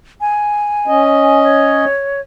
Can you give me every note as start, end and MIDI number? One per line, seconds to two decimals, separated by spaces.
0.21 1.39 80
0.87 1.85 61
0.87 1.85 75
1.43 2.21 73